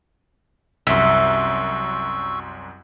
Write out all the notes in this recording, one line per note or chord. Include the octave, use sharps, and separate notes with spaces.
C2 F#2 E5 C#6 E6